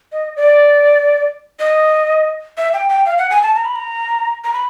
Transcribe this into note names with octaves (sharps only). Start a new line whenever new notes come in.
D#5
D5
D#5
E5
G5
G5
F5
F#5
G#5
A5
A#5
B5
A#5
A#5
B5